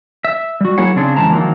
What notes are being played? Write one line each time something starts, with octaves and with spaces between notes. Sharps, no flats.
E5
G3 F#4
F#3 A#3 E4 G#4 C#5 F#5
C#3 C4 D4 G#4
F2 C#3 E3 G#3 A5 A#5
D#3 F3 F#3 A#3